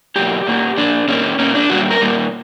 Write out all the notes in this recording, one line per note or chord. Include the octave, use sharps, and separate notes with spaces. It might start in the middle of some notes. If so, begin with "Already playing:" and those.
B2 F#3 A#3 G4
A#2 A#3
A#2 A#3 D4
A#2 A#3 C#4
A#2 A#3 C#4
D4
A#2 G3 A#3 F#4
A#4
A#2 G3 A#3